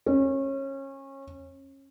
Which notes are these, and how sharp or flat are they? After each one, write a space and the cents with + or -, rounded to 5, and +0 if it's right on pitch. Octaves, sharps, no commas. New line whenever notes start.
C#4 -25